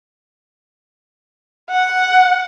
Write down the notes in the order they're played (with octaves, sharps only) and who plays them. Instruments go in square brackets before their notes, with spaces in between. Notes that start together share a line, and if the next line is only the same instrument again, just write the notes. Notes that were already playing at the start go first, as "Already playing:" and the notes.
[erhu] F#5